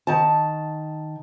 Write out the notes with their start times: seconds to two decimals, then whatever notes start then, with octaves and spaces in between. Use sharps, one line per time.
0.07 D#3 A5